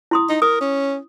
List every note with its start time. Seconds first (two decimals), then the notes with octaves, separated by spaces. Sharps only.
0.11 E4 C6 D#6
0.29 D#4
0.42 A#4 D#6
0.61 C#4